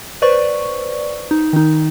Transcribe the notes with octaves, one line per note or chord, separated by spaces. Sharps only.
B4 C5 D5 C#6
D#4
D#3 D#4